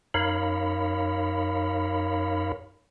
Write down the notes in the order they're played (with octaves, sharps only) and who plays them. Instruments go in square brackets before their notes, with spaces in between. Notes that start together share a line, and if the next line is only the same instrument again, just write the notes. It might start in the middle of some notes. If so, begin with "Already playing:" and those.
[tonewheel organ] F#2 D#4 A#4 C#5 F5 B5